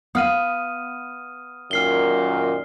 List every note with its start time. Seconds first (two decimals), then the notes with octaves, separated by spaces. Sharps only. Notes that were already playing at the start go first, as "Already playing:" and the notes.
0.15 B3 F5 F#5 D#6 F6 D#7
1.71 F#2 A#2 D#3 F6 C7 G7